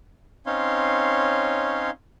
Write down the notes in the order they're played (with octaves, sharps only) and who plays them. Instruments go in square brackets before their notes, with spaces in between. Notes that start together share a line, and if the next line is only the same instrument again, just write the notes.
[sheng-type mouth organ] C4 C#4 D#4 C#5 F5 C6